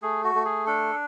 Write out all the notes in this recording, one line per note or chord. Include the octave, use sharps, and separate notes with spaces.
A3 G#4
F#4
A3
G#4
D4 A4